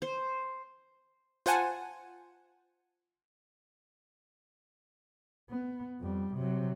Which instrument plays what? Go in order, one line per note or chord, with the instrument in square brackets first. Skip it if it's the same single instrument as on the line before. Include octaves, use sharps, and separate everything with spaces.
[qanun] C5
[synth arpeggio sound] F4 C5 F#5 G#5 A5
[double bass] B3
F2 G3
C3 F#3